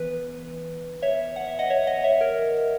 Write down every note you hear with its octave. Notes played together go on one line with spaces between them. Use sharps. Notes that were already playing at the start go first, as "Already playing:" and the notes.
Already playing: E3 B3 B4
C#5 E5
F#5
E5
D#5 F#5
C#5 E5
D#5 F#5
C#5 E5
A#4 C#5